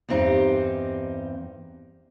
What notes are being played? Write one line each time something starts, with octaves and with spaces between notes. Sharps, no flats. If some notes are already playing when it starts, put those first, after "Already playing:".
E2 G2 C4 D#4 G4